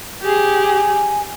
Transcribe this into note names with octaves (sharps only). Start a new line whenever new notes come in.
G4 G#4
G#5